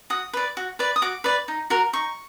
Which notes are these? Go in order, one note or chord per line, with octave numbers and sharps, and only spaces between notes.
F#4 D#6
B4 D5
F#4
B4 D5
D#6
F#4 D6
B4 D5
D#4
F#4 A#4
D#4 C#6